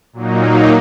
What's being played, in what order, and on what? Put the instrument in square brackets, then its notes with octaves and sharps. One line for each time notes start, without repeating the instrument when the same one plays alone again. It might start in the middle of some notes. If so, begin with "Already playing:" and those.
[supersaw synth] A#2 F#3 A#3 D#4